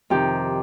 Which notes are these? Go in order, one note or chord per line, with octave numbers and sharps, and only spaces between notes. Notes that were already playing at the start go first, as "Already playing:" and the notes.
F2 C3 D#3 G4